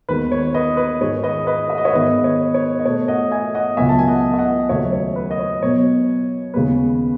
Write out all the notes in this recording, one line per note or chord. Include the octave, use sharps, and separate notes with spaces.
D#2 D#3 G#3 B3 B4
C#5
B4 D#5
B4
G#2 D#3 G#3 C#5
B4 D#5
B4 D#5
E5
D#5
C#5 E5
G#2 D#3 G#3 B3 B4 D#5
C#5
C#5
D#5
B2 A3 C#5
D#5 F#5
E5 G#5
D#5 F#5
C#2 C#3 F#3 B3 E5 G#5
A5
G#5
D#5 F#5
E5
D#5 F#5
D#2 C#3 F#3 A3 C#5 E5
C#5
B4
D#5
C#5
B2 F#3 B3 C#5
D#2 C#3 G#3 B3 B4